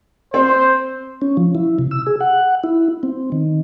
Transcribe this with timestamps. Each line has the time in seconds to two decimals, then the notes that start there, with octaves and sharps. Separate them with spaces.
0.34 C4 C5
1.22 C#4
1.37 F3
1.55 E4
1.79 C3
1.91 E6
2.07 G#4
2.21 F#5
2.64 E4
3.03 C4
3.32 D#3